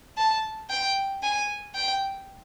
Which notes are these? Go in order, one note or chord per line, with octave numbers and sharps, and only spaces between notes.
A5
G5
G#5
G5